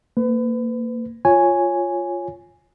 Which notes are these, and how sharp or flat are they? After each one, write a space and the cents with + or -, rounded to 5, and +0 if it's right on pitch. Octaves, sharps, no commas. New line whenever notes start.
A#3 -20 B4 +30
F4 +0 C#5 +0 G#5 +0